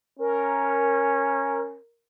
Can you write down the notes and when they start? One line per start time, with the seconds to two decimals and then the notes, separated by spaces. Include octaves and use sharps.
0.19 C#4 A#4